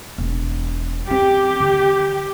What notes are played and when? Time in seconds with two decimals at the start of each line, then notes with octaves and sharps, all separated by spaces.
0.18 E1
1.10 C4 G4
1.60 D3